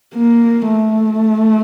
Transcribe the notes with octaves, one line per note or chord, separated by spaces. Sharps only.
A#3
A3